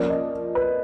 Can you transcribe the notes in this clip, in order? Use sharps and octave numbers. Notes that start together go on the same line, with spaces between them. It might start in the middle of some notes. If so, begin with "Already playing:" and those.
Already playing: F3 A#3 C#4 D5
D#5
B4